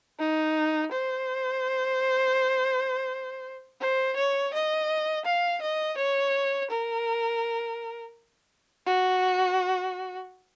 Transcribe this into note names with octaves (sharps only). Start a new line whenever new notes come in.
D#4
C5
C5
C#5
D#5
F5
D#5
C#5
A#4
F#4